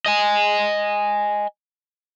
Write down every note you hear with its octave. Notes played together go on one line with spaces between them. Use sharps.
D#5 G#5